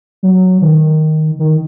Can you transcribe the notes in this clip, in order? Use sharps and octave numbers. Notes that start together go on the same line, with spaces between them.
F#3
D#3
D#3